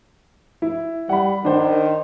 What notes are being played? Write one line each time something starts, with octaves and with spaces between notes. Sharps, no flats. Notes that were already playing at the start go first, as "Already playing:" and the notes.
E4
G3 F#5 B5
D#3 D4 C5